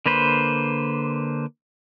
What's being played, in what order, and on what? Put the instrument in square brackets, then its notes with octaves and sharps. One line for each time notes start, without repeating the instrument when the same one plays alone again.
[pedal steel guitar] D3 A#3 B4 C5